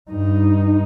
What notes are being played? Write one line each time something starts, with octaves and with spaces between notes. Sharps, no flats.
G2 D#4